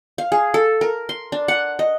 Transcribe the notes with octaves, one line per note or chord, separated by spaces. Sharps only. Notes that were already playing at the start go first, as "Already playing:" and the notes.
F5
G#4
A4
A#4
C6
D4
F#5
D#5